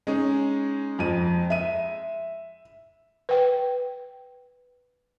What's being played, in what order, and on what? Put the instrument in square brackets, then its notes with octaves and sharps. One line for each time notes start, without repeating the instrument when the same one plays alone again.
[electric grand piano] G#3 D#4 G#4 [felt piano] C#4
[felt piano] F2 D#7
E5 D#7
[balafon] B4 G5